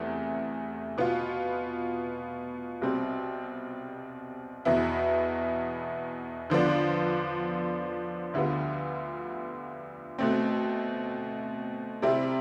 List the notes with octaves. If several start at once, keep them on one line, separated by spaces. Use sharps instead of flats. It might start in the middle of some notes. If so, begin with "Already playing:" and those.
Already playing: E2 C3 E3 A3 E4
B2 B3 F4
C2 B2 G3 C4
E2 B2 B3 E4
D3 F3 B3 D4
D2 D3 G3 B3 F4
B2 A3 C4
C3 G3 C4 E4